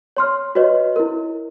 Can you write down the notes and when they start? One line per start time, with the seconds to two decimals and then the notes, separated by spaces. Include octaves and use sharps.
0.17 C#5 C6 F6
0.55 F#4 B4 C#5 D#5
0.96 E4 A#4